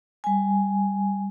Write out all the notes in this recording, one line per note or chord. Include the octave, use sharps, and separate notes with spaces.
G3 G#5